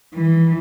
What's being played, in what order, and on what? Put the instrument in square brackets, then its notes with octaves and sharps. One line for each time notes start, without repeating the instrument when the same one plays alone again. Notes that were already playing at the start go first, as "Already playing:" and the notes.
[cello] E3